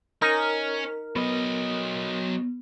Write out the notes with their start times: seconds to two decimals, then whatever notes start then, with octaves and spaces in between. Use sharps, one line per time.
0.22 C#4 D#4 A#4 F6
1.16 F#3 B3 D#5